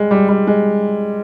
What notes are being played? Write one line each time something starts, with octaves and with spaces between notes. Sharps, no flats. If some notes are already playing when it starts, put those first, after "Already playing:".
Already playing: G3 G#3
G3
G3
G#3